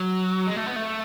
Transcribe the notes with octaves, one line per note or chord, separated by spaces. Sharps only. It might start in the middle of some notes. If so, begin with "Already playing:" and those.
Already playing: F#3
G#3
A3
B3
A3